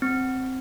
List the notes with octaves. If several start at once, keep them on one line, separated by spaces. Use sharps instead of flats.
C4